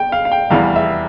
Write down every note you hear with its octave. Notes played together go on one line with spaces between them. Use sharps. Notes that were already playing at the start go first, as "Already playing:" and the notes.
Already playing: G5
F5
F5
G5
F1 E2 E3 G3 F5
E5